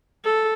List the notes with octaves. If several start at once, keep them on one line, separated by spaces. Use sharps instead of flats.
A4